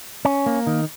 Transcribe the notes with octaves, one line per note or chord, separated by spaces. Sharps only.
C#4
A#3
D#3